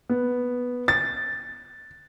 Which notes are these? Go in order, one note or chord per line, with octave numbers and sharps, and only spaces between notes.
B3
A6